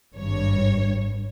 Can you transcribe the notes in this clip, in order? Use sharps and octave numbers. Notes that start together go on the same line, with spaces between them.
G#1 G2 C#5